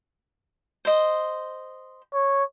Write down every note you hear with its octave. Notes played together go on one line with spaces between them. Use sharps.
C5 D#5
C#5